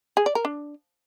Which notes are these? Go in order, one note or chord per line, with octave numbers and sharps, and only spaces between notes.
G#4
D5
A#4
D4